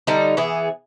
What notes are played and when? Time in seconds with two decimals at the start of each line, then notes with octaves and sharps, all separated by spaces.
0.07 D3 G3 D#4
0.37 E3 B3 G#4